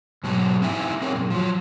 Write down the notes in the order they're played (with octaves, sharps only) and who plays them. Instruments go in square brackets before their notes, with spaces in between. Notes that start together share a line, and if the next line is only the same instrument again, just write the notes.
[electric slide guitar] G#2 B2 F#3 A5
C4 D#4 E4 G4 E5 G#5
C4 G#4 A#4 C#5
F#2 A#2
F3 F#3